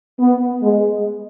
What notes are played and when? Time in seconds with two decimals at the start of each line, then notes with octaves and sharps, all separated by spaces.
0.19 B3
0.62 G#3